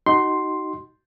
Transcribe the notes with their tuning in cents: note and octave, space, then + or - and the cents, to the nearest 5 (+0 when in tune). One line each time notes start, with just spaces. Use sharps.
D#4 +0 F#4 +30 C6 +0